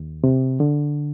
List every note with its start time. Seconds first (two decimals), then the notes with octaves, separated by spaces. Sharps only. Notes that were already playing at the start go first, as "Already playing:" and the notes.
Already playing: D#2
0.24 C3
0.60 D3